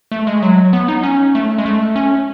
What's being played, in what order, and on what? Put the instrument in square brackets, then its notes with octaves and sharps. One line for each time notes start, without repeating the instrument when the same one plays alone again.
[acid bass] A3
G#3
F#3
B3
D#4
C#4
A3
G#3
A3
C#4